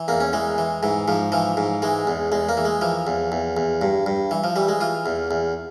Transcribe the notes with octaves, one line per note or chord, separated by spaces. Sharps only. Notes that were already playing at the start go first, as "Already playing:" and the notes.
Already playing: E3
E2 A#3
C#4
E3 G#3
E3
G#2 E3
G#2 F3
E3 F3
G#2
E3 G#3
E2
E2 G#3
A#3
E3
G#3
E3 F3
E2
E2
E2
G2
G2
E3
F3
E3 G3
G#3
E3 F4
E2
E2